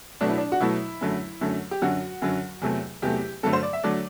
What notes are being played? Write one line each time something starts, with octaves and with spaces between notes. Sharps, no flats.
B2 F#3 A3 D4
E4
D4
F#4
B2 F#3 A3 E4
F#2 D3 F#3 A3
F#2 D3 F#3 A3
G4
F#2 D3 F#3 F#4
F#2 D3 F#3
E2 C3 F#3 A3
E2 C3 F#3 A3 G4
G2 D3 F#3 A3 A4
C5
D5
E5
D3 F#3 A3 D5